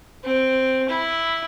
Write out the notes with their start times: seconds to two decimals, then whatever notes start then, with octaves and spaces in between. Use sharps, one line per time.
0.24 C4
0.89 E4